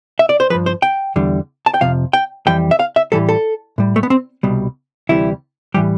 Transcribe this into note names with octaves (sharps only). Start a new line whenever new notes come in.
E5
D5
C5
G2 F3 B4
C5
G5
E2 D3 G3
A5
G5
F2 C3 F3 F5
G5
F2 E3 G3 G5
E5
F5
E5
A2 E3 G3 A4
A4
A2 G3
A3
B3
C4
C2 B2 G3
D2 C3 E3 G3 E4
A2 E3 G3 G4